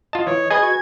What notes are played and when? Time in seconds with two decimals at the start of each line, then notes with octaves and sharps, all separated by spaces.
0.13 F4 D#5 A5
0.27 E3 C#5
0.51 G#4 B4 D#5 G#5 G#6
0.62 F#4